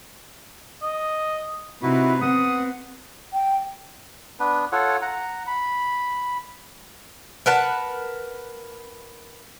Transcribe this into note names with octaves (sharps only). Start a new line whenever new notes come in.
D#5
C3 D#4 E4 F#4 B4
B3 C4 F#5 D#6
G5
B3 D4 B4
F4 A4 C#5 F#5
F#5 A#5
B5
A#4 B4 F#5 A5